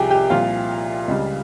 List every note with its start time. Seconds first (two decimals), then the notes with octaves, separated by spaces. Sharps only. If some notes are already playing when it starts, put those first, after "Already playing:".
Already playing: C2 C3 F3 G4 G#4 G5 G#5
0.10 G4 G5
0.30 C2 A#2 F3 F4 F5
1.08 C#2 C#3 G3